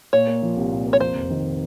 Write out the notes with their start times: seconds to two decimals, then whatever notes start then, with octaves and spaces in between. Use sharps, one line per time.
0.13 A#2 C#5
0.27 A#3
0.42 F3
0.57 C2
0.72 A#2
0.86 A#3
0.93 C#5
1.00 F2 C5
1.15 F1
1.30 D#3